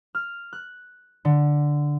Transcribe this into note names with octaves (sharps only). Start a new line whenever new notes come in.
F6
F#6
D3